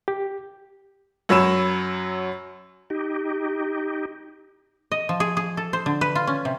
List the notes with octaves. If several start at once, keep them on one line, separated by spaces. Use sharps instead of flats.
G4
F#2 F#3 C#5 B5 E6 E7
D#4 G4
D#5
F3
G#4
G#4
A4
C5
D3
B4
F4
C#4
C3